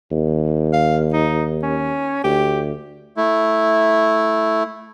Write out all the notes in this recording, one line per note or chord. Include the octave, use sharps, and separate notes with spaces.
D#2
F5
D#4
C#4
D2 G4
A3 E4